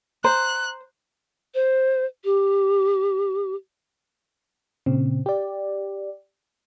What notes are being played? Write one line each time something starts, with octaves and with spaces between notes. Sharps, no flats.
C5 A#5 F#6
C5
G4
A#2 C#3 C4
G4 D5